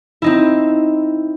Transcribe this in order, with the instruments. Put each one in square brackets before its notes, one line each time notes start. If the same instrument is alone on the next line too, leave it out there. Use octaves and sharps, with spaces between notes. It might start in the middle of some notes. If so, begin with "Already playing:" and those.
[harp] C4 D#4 E4